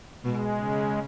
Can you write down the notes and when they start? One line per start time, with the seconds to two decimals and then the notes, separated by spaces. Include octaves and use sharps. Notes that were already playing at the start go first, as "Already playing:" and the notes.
0.24 B2 G#3
0.60 C#3